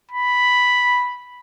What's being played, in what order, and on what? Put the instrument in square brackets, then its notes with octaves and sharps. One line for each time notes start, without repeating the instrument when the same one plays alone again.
[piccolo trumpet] B5